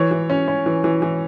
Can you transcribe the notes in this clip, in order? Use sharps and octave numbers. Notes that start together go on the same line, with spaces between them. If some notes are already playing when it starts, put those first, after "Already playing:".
Already playing: E3 C#5
E3
C#4
C#4
E3
E3
E3